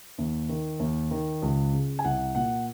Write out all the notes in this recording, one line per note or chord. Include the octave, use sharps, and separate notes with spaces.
D#2
D#3
D#2
D#3
C#2
C#3
G#5
C2 F#5
A#2 F#5